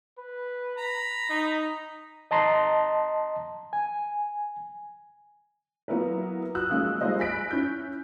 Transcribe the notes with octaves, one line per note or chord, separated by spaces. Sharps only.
B4
A#5 B5
D#4
D#5 A5 A#5 C6
G#5
F#3 A#3 B3 E4 A#4 B4
F#4 D#6 E6 F#6
F3 G#3 A#3 C#4 F4
G3 G#3 A#3 F4 C5 D#5
G#5 B5 F#6 B6 D7
C#4 E4 G6 D7